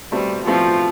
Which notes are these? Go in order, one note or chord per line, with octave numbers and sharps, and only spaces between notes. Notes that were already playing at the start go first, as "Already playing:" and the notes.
B2 G3 A3 C4
B2 F3 A3 C4